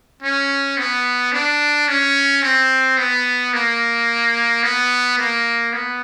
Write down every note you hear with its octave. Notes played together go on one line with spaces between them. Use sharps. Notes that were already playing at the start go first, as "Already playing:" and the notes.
C#4
B3
D4
C#4
C4
B3
A#3
B3
A#3
B3